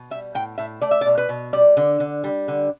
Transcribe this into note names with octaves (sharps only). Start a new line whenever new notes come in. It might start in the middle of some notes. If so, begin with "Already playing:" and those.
Already playing: B2
G3 E5
A2 G5
A2 E5
A3 D5
E5
D5
B2
B4
B2
G3 D5
D3
D3
G3
D3